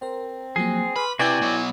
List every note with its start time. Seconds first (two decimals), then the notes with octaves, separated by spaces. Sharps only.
0.02 C4 A#4 C5
0.56 F3 F#3 A#3 G#4
0.96 B4 B5 C6 D6 F6
1.19 C3 E4 F#4 B4 D5 G5 G#5
1.42 B2 F#3